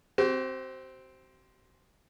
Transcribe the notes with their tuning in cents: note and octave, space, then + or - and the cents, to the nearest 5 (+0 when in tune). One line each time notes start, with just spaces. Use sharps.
C4 +0 F#4 +45